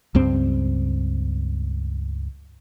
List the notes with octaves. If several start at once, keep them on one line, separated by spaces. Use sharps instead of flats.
C#2 G2 C4